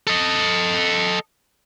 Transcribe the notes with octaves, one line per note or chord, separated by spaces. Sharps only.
A4 D#5